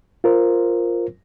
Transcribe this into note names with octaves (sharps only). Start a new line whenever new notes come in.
F4 A#4 C5